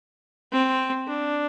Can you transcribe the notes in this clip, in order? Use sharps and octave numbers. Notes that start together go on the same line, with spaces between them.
C4
D4